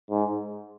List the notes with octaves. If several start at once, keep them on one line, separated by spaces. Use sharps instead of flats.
G#2